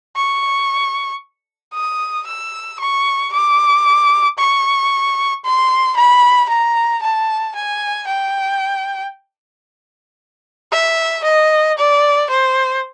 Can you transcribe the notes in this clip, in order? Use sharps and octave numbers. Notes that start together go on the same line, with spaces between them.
C#6
D#6
E6
C#6
D6
C#6
C6
B5
A#5
A5
G#5
G5
E5
D#5
D5
C5